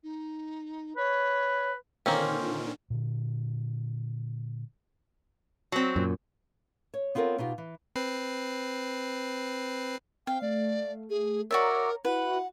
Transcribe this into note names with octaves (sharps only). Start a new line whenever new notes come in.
D#4
B4 C#5
A#2 D3 D#3 A#3 C4 C#4
A#2 D3
F#3 C4
F#2 A#2
C#5
B3 C4 F4 A4 A#4 C#5
B2 D#4 F4 G4
E3
C4 B4 C7
C4 F5 G5
A3 D5
G#4
F#4 A#4 C#5 D5 E5 A#5
E4 F#4 B4 F#5